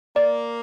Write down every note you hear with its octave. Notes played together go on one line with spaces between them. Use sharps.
A#3 D5